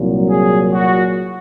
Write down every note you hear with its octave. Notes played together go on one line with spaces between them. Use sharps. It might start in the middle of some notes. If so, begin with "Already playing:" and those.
Already playing: C2 A#2 F#3
G#4
F#4